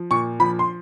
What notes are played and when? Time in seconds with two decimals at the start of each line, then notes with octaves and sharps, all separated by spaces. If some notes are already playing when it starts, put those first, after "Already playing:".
Already playing: F3
0.11 A#2 C#6
0.39 F3 B5
0.59 C6